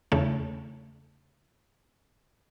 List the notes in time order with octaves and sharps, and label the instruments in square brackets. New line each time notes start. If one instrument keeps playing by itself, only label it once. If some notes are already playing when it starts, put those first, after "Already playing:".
[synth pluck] E2 C#3 A3